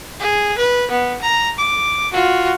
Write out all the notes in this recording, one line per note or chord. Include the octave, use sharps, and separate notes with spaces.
G#4
B4
B3
A#5
D6
F4 F#4